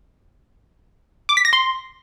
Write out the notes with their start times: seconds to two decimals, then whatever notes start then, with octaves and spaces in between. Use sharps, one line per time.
1.29 D6
1.37 B6
1.45 A#6
1.53 C6